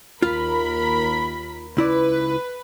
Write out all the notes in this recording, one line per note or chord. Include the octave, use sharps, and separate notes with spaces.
D#2 F4 A#4 B5
C#2 E4 B4 D5